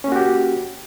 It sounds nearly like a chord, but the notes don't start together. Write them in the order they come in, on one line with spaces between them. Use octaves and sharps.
C#4 A#3 F#4 G4